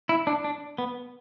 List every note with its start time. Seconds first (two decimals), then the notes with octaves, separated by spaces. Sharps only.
0.09 E4
0.27 D4
0.44 D4
0.78 B3